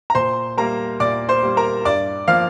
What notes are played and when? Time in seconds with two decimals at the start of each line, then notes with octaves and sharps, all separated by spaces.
0.10 A#5
0.15 A#2 C5 C6
0.57 G3 A#3 A#4 A#5
1.00 A#2 D5 D6
1.29 C5 C6
1.43 G3 A#3
1.57 A#4 A#5
1.85 G2 D5 D6
2.28 F3 A#3 F5 F6